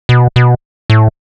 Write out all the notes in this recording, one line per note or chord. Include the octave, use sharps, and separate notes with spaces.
B2
B2
A2